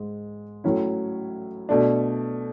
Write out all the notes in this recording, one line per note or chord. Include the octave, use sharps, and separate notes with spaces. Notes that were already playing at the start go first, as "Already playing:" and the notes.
Already playing: G#2 G#3
A2 F#3 C#4 E4
B2 A3 D4